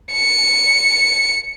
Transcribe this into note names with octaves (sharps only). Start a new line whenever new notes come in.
C#7